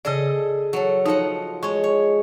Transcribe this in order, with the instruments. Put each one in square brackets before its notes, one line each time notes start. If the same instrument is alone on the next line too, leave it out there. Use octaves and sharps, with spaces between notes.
[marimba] C#3 D5 [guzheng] G#4 A4 D#5
[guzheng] F#3 A4
[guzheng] F3 D#5 F#5 [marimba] D#4 C#5
[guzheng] G#3 C#5 [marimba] C#6
[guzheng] C#5